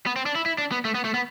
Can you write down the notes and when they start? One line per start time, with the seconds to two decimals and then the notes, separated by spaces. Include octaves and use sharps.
0.07 B3
0.16 C4
0.26 D4
0.35 E4
0.46 E4
0.58 D4
0.72 B3
0.85 A3
0.95 B3
1.05 A3
1.14 B3